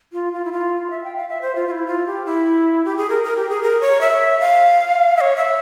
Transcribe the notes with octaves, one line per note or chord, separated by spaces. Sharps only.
F4
F4
E4
F4
E5
G5
F5
E5
C5
F4
F4
E4
F4
G4
E4
G4
G#4
A#4
A#4
G4
G#4
A#4
C#5
E5
F5
E5
C#5
E5